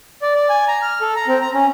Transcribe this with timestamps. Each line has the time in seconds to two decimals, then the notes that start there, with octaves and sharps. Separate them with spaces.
0.22 D5
0.35 D5
0.49 G#5
0.68 A#5
0.82 F6
1.01 A4
1.16 A#5
1.28 C4
1.42 A#5
1.54 C#4